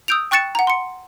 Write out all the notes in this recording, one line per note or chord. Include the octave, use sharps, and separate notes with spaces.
D#6 E6 G6 D7 F7
G5 C#6 F#6 A6 C#7 E7
F#5 A#5
C6 C#7